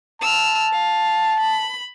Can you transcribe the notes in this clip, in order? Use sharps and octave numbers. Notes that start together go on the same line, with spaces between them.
A5 E6 F6
F5
B5